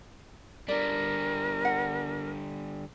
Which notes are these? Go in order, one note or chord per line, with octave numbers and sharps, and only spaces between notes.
D3 G3 A#4 D5
F#5